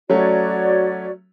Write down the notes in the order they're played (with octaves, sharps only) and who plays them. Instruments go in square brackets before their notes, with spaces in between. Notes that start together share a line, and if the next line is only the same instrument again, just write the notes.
[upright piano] F#3 A3 C#4 [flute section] F#4 C#5 D5